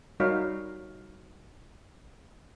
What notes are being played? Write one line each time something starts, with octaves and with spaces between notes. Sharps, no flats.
G3 D#4 F#4 A#4 C#5 F5